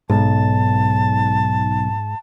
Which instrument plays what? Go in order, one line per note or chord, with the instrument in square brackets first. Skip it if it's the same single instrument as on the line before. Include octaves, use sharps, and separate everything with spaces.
[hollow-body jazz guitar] B1 [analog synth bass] G#2 [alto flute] A5